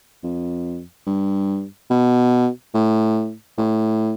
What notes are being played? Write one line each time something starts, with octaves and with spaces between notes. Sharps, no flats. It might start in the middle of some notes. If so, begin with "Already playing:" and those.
F2
G2
B2
A2
A2